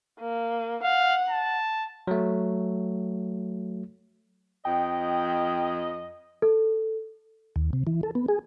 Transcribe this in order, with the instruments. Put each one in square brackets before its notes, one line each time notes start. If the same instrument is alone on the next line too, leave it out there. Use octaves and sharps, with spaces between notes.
[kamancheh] A#3
[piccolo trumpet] F5 [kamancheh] F#5
[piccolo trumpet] A5
[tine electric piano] F#3 A3
[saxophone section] F2 D#5 [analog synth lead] G5
[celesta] A4
[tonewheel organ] D#2
C3
E3
A4
B3
G#4